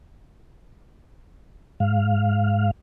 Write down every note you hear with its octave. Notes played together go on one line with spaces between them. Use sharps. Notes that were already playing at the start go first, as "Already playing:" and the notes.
G#2 F5